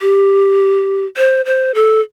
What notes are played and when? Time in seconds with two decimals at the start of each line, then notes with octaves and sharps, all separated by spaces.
0.01 G4
1.17 C5
1.46 C5
1.75 A4